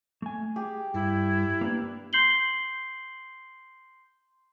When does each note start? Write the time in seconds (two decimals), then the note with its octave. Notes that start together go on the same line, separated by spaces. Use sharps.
0.22 A3 G#5
0.56 G4 G#4
0.94 G2 E4
1.61 A#3 D4 B4
2.13 C6 G6 C7 F#7 G7